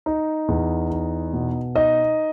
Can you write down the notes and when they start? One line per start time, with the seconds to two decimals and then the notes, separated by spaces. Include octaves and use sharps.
0.06 D#4
0.48 E2
0.90 D#4
1.33 B2
1.75 D#4 D#5